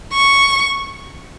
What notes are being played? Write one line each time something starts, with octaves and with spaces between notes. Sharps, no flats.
C#6